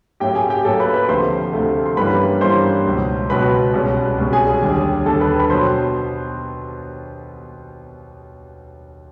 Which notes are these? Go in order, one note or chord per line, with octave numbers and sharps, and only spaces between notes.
A2 F#3 A#3 C#4 G4 G5
G#4 G#5
G4 G5
A2 F#3 A#3 C#4 A4 A5
B4 B5
B4 B5
D2 C3 F3 A3 C5 C6
D2 C3 F3 A3
C6
G2 E3 G3 A#3 C#4 B4 B5
G2 E3 G3 A#3 C#4 C5 C6
C#2 B2 F#3
C#2 B2 F#3 B4 B5
C2 B2 G#3 C#4
C2 B2 G#3 C#4
G#4 G#5
G#4 G#5
D#2 D3 G3
D#2 D3 G3 A4 A5
B4 B5
B5
B2 F#3 B3 C5 C6